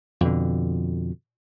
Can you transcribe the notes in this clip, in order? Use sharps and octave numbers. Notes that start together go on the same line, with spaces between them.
F2 B2 D3